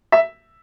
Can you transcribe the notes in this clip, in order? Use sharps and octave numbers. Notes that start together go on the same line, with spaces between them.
E5